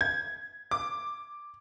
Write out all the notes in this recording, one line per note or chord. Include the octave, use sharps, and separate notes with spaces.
G#6
D6